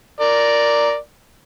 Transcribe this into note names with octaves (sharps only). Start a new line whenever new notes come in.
A#4 D5